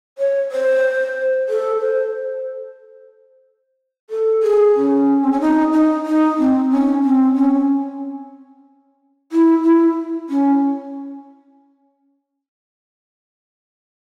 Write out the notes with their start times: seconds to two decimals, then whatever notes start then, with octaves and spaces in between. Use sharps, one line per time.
0.18 C#5
0.52 C5
1.49 A4
1.81 C5
4.10 A4
4.43 G#4
4.75 C#4
5.24 C4
5.33 C#4
5.41 D#4
5.73 D#4
6.05 D#4
6.39 C4
6.70 C#4
7.03 C4
7.36 C#4
9.32 E4
9.64 E4
10.29 C#4